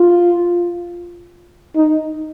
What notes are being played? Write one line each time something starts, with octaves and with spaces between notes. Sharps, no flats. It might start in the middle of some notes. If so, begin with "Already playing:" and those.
Already playing: F4
D#4